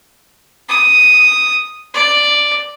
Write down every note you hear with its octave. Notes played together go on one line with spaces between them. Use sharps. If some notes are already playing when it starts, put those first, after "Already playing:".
D#6
D5